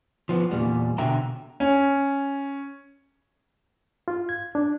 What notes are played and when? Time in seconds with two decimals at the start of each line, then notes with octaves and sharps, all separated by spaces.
0.29 F3 B3
0.51 E2 A#2 G3
0.98 B2 D3 E5 G5 A#5
1.60 C#4
4.08 F4
4.29 G#6
4.55 D4